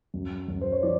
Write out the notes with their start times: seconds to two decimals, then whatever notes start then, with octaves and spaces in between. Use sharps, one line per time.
0.14 F#2
0.48 F#2
0.61 C5
0.72 C#5
0.83 F3 D5